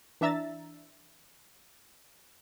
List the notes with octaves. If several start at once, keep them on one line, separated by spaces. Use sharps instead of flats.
E3 D4 E5 A#5 E6 A6